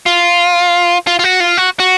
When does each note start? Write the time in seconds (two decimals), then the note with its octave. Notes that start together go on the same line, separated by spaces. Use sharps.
0.06 F4
1.07 F4
1.19 F4
1.24 F#4
1.40 F4
1.58 F#4
1.80 F#4